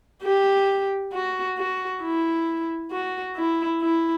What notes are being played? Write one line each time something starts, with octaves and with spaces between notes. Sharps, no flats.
G4
F#4
F#4
E4
F#4
E4
E4